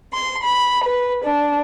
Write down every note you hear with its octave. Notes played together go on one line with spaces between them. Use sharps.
C6
B5
B4
D4